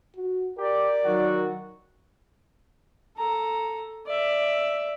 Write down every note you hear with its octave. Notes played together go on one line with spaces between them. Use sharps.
F#4
G4 A#4 D5
D#3 F#3 F#4
A4 A#5
D5 E5